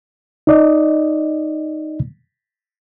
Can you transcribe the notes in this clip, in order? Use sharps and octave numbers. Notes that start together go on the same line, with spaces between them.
D#4 D5 D#5